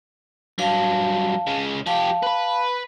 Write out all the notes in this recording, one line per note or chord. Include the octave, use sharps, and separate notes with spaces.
G2 F#3 F5 A5
C#3 G#3
F3 G4 F5 A5
B4 B5